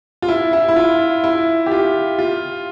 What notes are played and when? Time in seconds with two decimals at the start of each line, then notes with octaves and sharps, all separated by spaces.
0.22 F4
0.29 E4
0.53 E4
0.68 E4
0.76 F4
1.24 E4
1.66 G4
1.71 F4
2.19 F4